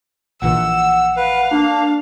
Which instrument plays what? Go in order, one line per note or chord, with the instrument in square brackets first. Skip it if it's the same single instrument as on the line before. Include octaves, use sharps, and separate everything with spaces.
[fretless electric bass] A#1 A#2 E3 [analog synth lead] F#5 [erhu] E6
[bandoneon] B4 [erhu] F5
[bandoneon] A#3 [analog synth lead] D4